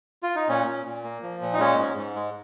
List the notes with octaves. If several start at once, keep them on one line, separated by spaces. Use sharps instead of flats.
F4
D#4
A#2 C#4
A#2
A#2
A#3
F3
A#2
D#4
G#3 C#4
G#2
G#2
G#3